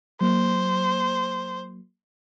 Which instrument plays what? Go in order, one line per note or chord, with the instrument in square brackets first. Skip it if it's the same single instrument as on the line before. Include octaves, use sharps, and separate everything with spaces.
[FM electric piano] F#3 A#3 [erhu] C5